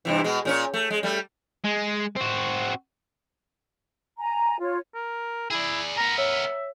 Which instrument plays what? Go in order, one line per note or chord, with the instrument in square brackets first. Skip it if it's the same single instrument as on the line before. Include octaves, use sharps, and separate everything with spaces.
[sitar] G2 C3 E3
B2 G#3
A#2 C#4 C#5
A3
G#3
G3 A3
[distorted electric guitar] G#3
C4 F#4
[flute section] G#5 A#5
F4 C#5
[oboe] A#4
[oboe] E4 [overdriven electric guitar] G#4 D5
[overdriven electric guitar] B3 A#4 [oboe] A#5
[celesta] C#5 [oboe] E5